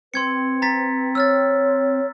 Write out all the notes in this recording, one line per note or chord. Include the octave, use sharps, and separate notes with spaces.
C4 B4 C6 G#6 C#7
A#5 A6 B6
C#5 E6 F6 A6